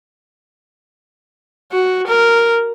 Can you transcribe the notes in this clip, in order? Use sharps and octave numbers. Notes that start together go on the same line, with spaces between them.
F#4
A#4